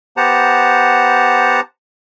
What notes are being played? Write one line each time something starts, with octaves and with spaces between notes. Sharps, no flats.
B3 G4 C5 F#5 A5 A#5